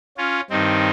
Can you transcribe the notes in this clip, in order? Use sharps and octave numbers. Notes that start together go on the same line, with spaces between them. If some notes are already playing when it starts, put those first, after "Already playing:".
C#4 F4
G2 D#3 C4 D#4